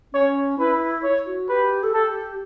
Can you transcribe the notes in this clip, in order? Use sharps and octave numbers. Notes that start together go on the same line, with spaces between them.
C#4 C#5
E4 B4
C#5
F#4
G4 B4
A4
G4 A4